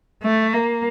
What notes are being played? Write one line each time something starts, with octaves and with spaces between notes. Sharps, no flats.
A3
A#3